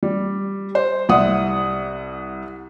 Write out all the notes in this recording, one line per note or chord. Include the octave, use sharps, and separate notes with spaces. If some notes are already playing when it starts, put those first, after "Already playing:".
G3
C5
C2 E5 F#5 D#6